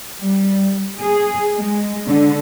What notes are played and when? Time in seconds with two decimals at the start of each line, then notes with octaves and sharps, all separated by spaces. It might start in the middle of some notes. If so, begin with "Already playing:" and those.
0.19 G3
1.00 G#4
1.56 G#3
2.07 D3